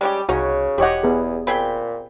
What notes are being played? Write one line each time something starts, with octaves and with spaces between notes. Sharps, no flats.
G3 G#3 C#4 G4
C2 C#3 C#4 D#4 F#4 C#5
E1 E4 G4 C#5 D#5 F#5
E2 B3 G#4
A#2 C4 G#4 G5 B5